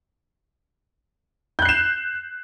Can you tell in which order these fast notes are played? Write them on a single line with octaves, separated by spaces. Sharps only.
G6 F#6 C7 E7